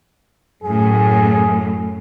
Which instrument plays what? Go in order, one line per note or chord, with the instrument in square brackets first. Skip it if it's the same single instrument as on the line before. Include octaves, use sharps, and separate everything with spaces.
[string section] F#2 A2 [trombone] G#4